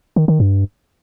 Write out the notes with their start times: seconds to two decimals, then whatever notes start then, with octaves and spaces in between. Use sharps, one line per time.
0.16 D#3
0.28 D#3
0.40 G2